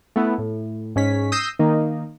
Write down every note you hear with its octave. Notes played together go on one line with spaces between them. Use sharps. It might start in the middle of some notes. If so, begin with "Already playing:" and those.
A3 B3 E4
A2
G#2 C#4 B6
D#6 E6 G6 A#6 C7
D#3 A#3 D#4